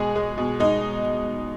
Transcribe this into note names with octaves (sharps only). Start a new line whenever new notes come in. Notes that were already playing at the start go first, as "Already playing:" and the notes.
Already playing: B2 G#3 G#4
G#3
B2
G#3 D#4